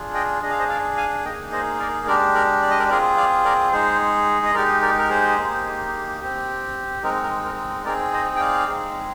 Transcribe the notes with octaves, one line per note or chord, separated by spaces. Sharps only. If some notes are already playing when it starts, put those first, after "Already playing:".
Already playing: D4 F4 G#4
D#5 G5
D4 G#4 D#5
F5
C5 D#5
D5 F5
F5 G#5
A#3 D#4 G#4 D#5 G5
C5 D#5
A#4 D5
G#3 D4 G4 A#4 D5
A#4 D5
D5
D#5
A#4 D5
C4 F4 G#4 A#4 D5
D5 F5
A#4 D5
G#3 D#4 G#4 C5
D#5
G#3 D#4 G4 A#4 D5
A#4 D5
A#4
G#4 C5
A#3 D#4 G4
C4 G4
G#3 C4 D#4 A#4
A#4
A#4
C4 D#4 G#4 A#4 D5
C5 D#5
G5
D5 F5
G#3 C4 D#4 G#4